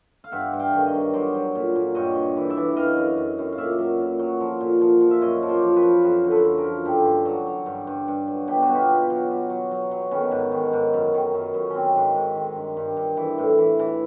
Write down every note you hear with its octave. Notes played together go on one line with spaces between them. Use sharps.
F5
G2 E5 F#5
G2
F5 G5
D#3
C#5 D#5
G2
F#3 C5 D5
F#3
A#2
A#2
G2 C#5 D#5
G2
E3
D5 E5
E3
F#2 D#5 F5
F#2
F#2
F#2
F5
A#2 D5 E5
F#3
A#2
F#3
F3
A#2
F3
F3
E5
F#2 C#5 D#5
F3
C5 D5
F3
B4 C#5
F3
F#2 A#4 C5
D3
A4 B4
F#2
G#4 A#4
F3
G2 G4 A4
G2
F#3
F#3
G2
G2
G2
F#3
B2 G4
F#4
B2
F4 G4
B2
F#3
F#3
F#3
F#3
F#3
D#3 B3 C#4
G#2
D#3
G#2
F#2
D#3
F#2
F#2
D#3 C4 C#4
G#2
G#2
D#3
G2
G2
G2
E3
A2
E3
E3